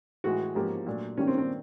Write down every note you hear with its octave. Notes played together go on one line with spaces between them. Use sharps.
A2 E3 G#3 F#4
G#2 F3 A#3 C#4 G4
A#2 F#3 A3 D4
D#3 G3 A#3 C#4 D4 G4
C4
C4